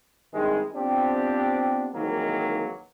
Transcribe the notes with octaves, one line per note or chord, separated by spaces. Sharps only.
G2 C3 D#3 G#3
F3 B3 C4 D4 G4
C2 G#2 D#3 E3 F#3 A#3